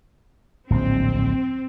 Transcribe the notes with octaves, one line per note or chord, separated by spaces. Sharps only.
D1 A#1 G#2 C4